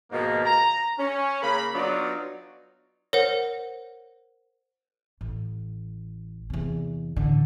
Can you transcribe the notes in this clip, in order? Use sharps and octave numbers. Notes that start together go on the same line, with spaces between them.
G#2 B2 D#3 F3 A#3
A#5
C#4
C#3 A#3 A#4 B5
F#3 B3 D4 D#4 F4 D5
A#4 C5 C#5 F#5
A1
E2 C3
A1 D3